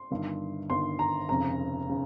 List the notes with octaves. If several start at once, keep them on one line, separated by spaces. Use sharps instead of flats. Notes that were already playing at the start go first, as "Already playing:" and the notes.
Already playing: C6
G1 G2 D#3
G1 G2 D#3 C6
A#5
F1 F2 C#3 A#5
C#3